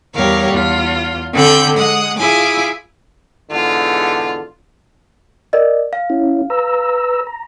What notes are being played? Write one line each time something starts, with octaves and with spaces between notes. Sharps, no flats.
E2 G3 A#4 C#5 F5
E2 F4
D3 C4 A4 B5 G6
G#3 F#5 D#6
E4 F4 G#4 G#5 D6
E2 G#2 D3 F4
A#4 D5 D#5
F5
C#4 E4
B4 A#5 E6
A#5